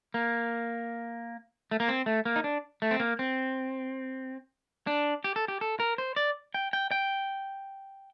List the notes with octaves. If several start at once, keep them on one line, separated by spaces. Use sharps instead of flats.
A#3
A3
A#3
C4
A3
A#3
D#4
D4
A3
C4
A#3
C4
D4
G4
A4
G4
A4
A#4
C5
D5
G5
G5
G5